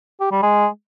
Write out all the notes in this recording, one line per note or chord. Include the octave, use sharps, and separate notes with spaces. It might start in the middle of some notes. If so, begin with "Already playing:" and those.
G4
G3
G#3